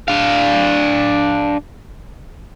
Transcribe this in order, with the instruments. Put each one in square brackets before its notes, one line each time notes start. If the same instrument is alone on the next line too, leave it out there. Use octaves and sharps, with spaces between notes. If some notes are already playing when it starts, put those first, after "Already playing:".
[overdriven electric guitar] D4 F5